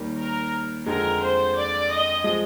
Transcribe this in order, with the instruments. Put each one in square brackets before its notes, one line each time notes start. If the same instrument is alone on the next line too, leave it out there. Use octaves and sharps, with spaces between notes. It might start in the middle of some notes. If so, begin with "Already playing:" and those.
Already playing: [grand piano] D#2 D#3 G3
[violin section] A#4
[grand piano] F2 D3 G#3 [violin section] A#4
[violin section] C5
D5
D#5
[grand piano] F3 G#3